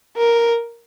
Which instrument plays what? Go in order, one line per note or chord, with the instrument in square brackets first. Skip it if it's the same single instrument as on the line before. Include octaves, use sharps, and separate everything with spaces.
[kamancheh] A#4